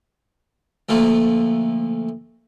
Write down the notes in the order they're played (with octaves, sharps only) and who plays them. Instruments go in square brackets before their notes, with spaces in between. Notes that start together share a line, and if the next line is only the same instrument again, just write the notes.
[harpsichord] D2 F3 A3 A#3